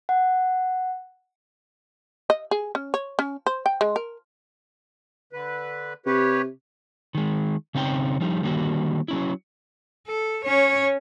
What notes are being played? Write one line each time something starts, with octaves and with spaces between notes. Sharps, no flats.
F#5
D#5
G#4
C#4
C#5
C#4
C5
G5
G#3
A#4
D3 B4
C3 G4 B4 C#5
D#3 G#3
C#3 C4 C#4 D#4 G5
F3 G3 D#4
D3 D#3 G3 A#3 F#4
F#3 C#4 E4
A4
C#4 C#5